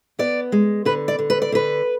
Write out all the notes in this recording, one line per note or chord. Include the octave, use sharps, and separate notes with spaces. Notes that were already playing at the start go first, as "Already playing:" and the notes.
B3 D5
G#3
D3 B4
D5
D3
B4
D5
D3 B4